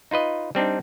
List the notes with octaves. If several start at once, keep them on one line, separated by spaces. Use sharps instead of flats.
D#4 F4 B4 D#5
G3 C4 D4 D#4